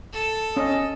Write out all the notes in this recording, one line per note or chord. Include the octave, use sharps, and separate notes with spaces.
A4
C#4 D#5